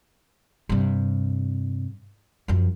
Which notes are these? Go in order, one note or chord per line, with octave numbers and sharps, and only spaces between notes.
G2 C3
F#2 F3